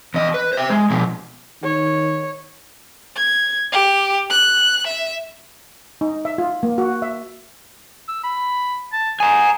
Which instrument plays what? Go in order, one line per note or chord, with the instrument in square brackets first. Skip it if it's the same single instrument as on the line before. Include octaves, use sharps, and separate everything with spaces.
[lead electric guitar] E2 D#5
B4
C5 E5
G#3
B2 F3
[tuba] D#3 [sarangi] C#5
[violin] G#6
G4
F#6
E5
[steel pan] D#4
E5
F4
A#3
F#4
E5
[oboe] E6
B5
A5
[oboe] G#4 [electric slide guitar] G#5 A#5